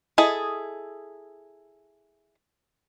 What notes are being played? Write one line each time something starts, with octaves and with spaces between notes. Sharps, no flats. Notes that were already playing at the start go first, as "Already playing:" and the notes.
E4 G#4 A4 D#5